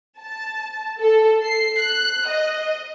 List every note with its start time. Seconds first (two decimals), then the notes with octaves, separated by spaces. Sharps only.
0.21 A5
1.00 A4
1.45 C7
1.80 F#6
2.28 D#5